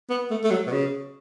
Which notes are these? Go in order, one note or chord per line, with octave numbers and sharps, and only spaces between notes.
B3
A3
A3
F#3
B2
C#3